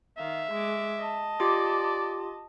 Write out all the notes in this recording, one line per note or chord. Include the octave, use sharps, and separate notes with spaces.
D#3 E5 F5
G#3 D6
D#5 A5
F4 G4 D5 D6